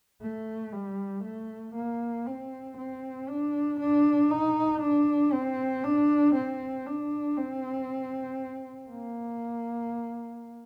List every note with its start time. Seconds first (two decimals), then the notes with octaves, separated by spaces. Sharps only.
0.22 A3
0.73 G3
1.24 A3
1.75 A#3
2.26 C4
2.77 C4
3.29 D4
3.80 D4
4.30 D#4
4.82 D4
5.33 C4
5.84 D4
6.35 C4
6.86 D4
7.37 C4
8.90 A#3